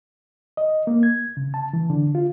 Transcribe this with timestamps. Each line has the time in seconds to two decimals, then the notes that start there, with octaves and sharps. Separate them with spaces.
0.57 D#5
0.87 A#3
1.03 G#6
1.37 C#3
1.54 A5
1.73 E3
1.90 D3
2.15 F4